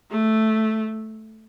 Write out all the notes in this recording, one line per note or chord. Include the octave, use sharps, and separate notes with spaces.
A3